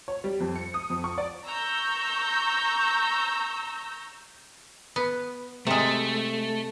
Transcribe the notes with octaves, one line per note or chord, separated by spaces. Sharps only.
C#5
G3
F2
C#7
D#6
F2
C#6
D5
A#5 C#6 E6 G6
B3
C3 G#3 A3